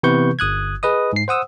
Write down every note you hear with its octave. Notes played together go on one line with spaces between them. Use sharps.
C3 E3 B3 B4 C#6 G6
G1 D#6 F#6 G#6
G#4 B4 D#5 D#6
G#2 C7
C5 F#5 D#6 E6